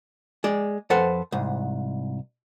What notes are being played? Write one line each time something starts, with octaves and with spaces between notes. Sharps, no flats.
G#3 D5
F2 A4 B4 C5 F#5
C2 G#2